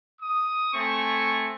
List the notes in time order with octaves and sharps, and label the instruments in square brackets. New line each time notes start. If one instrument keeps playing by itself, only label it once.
[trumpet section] D#6
A3 C4 G#5 C#6